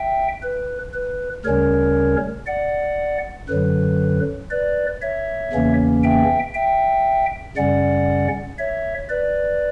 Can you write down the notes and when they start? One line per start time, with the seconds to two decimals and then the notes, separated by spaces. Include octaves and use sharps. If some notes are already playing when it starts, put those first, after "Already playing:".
Already playing: E5 G5
0.43 B4
0.94 B4
1.45 D2 C#3 G3 C#4 A#4 C#5
2.46 D5 F#5
3.49 F#2 D3 F#3 B4
4.51 B4 D5
5.02 C#5 E5
5.53 E2 C#3 E3 A#3 C#4
6.04 E5 G5
6.54 E5 G5
7.56 F#2 C#3 G3 C#4 D5 F#5
8.58 C#5 E5
9.09 B4 D5